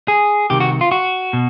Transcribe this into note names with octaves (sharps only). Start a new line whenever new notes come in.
G#4
C2 C3 D#3 G4
F#4
F4
F#4
B2